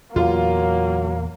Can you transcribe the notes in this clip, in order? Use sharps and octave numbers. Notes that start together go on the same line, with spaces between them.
E2 A#2 D3 F#3 A#3 F4